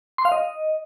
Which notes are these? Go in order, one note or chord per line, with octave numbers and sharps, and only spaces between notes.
C6
F5
D#5